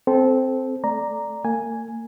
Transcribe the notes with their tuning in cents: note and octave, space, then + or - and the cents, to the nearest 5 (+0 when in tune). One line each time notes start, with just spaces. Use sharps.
C4 +0 A4 -20
A3 +0 D5 +0 A#5 +0
A#3 -35 G#5 +0